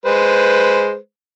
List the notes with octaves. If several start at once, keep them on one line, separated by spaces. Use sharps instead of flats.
G#3 B4 C5